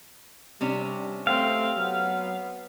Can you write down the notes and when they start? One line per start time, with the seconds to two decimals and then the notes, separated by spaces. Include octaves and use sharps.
0.61 C3 G3 C#4 D4
1.27 A3 C4 F5
1.76 F#3 B3